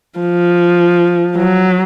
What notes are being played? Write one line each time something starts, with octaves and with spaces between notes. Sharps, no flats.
F3
F#3